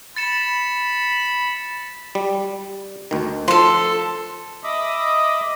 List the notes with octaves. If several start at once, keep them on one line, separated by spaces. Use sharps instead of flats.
B5 A6 C#7 E7
G3
D2 D#3
F3 A4 C6
D#5 E5 B5 D6 D#6